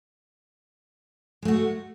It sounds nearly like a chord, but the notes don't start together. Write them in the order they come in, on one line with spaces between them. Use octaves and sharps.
G#3 A3 F#4